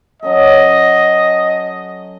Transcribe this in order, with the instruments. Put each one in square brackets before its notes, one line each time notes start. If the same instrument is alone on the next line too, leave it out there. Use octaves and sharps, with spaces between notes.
[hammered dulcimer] F#3 C#4 A4 [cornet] D#5